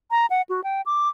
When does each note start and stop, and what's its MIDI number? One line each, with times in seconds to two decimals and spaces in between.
0.11 0.26 82
0.30 0.42 78
0.49 0.61 66
0.64 0.81 79
0.86 1.09 86